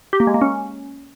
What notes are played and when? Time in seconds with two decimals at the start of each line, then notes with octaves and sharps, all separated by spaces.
0.13 G4
0.20 A#3
0.27 G#3
0.34 A#3
0.41 C#4